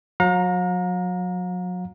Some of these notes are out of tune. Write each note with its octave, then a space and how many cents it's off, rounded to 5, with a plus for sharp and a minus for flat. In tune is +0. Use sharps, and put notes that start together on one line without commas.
F#3 -30 F5 +45 A#5 +0